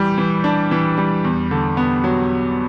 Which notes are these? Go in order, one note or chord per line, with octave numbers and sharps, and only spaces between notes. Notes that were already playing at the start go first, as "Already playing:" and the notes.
Already playing: E3 G3
E3
D4
E3
G3
E2
D3
B3
F#3